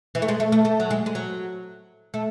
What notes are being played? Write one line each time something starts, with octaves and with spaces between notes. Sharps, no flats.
E3
A3
G#3
A3
A3
A3
F#3
G#3
G#3
F#3
A3